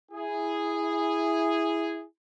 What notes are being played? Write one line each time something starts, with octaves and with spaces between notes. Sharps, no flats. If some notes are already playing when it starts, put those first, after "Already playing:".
E4 G#4